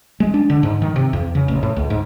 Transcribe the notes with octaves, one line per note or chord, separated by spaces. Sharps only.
G#3
D4
D3
G#2
D#3
C3
E2
C#3
A1
A2
C#2
G#2